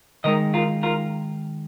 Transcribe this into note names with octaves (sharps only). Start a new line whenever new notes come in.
D#3 G#3 D#4 A#4 D#5
F4 A#4
F4 A#4